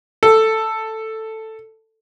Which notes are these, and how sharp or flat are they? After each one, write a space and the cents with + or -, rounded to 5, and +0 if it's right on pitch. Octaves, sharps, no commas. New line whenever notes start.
A4 +5